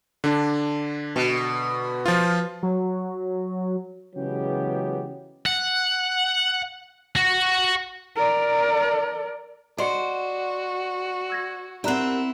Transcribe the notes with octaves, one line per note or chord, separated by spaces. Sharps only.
D3 D4
B2
F3 F4
F#3
C#3 E3 F#3 G#3 B3 G4
F#5
F#4
A#4 D5
F#4 C5 D5 D#5 C6 C#7
E6 G#6 A#6
C4 E4 G4 A#4 D5 F#5 A#5 F#6